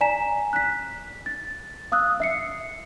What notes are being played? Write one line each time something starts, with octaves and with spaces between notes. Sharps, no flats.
D5 G#5 A#5 B6 E7
F#6 B6
A6
F5 D#6 E6 F#6
E5 C7 C#7